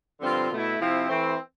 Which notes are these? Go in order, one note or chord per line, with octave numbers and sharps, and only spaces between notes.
G2 D3 F3 C4 F4
B2 A3 E4
C3 F3 C4 E4
E3 A3 C4